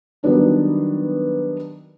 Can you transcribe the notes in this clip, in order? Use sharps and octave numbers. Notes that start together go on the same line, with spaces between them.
D#3 F#3 G3 B3 D4 D#4